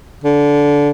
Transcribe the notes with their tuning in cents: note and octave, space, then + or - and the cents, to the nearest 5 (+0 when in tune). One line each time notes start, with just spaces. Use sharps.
D3 -20